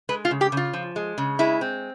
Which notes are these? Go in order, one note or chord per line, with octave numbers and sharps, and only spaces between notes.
G#3 B4
F4
C#3
G4
C#3
F4
F3
G#3
C#3
G#3 E4
C4